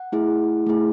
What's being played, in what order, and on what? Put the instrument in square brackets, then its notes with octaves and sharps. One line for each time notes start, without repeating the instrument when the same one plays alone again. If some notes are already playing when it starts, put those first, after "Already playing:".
Already playing: [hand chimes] F#5
A3 E4 G#4
A3 E4 G#4